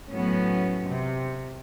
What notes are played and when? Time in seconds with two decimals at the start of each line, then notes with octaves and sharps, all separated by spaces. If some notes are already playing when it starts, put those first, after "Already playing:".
0.12 A2 F#3 B3 C#4
0.87 C3